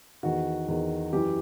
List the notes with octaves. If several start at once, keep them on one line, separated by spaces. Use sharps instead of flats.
E2 D#3 F#4
E2 D#3
F#2 E3 G4